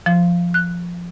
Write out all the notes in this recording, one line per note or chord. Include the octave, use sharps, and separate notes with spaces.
F3
F#6